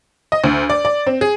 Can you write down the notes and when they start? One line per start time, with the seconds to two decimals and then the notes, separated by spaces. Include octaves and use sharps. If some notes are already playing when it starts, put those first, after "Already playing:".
0.32 D#5
0.44 D2
0.70 D5
0.85 D5
1.06 C4
1.21 G#4